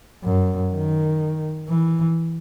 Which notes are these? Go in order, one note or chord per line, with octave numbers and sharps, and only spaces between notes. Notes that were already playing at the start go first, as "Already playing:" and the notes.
F#2
D#3
E3